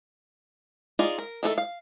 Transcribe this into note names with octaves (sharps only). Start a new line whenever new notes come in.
D#4 F4 G#4 D5
A#4
D#3 A3 D4 A4
F5